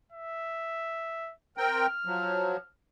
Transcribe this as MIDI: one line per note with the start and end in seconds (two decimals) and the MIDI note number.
0.12 1.33 76
1.58 1.87 60
1.58 1.87 70
1.58 1.87 79
1.58 2.71 89
2.05 2.57 53
2.05 2.57 54